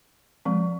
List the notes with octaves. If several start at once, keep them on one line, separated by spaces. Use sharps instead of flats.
F3 G#3 C4